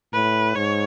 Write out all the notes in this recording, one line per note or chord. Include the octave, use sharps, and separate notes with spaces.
A2 B4
G#2 C#5